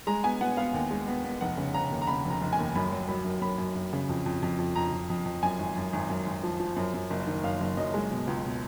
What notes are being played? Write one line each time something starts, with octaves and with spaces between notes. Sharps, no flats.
G#3 A#5
B3 G#5
B3 F#5
B3 F5
D#2
G#3
B3
B3
F1 F#5
C#3
C#3 A#5
D#2
A#5
C#3 B5
F1 A#5
F1
G#5
D#2
F#2 B5
F#3
F#3 B5
F#2
F#2 B5
F#2
F#2
C#3
F2
F2
F2
F2
F2 A#5
F2
F2
F2
F#2 G#5
G#1
F#2
G#1
F#2
G#1
F3
F3
F#2
F#2
F#1
D#3
F#2 F5
F#1
F#2 D#5
G#3
B2
C#2
B2